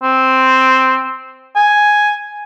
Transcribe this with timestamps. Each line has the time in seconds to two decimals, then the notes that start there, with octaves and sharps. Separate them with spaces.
0.03 C4
1.56 G#5